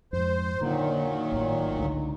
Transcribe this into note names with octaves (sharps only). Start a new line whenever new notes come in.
F2 G#2 C5
A#2 D3 D#3 F#3 A#3 D#4
G#1 A2
C#2 D3 A3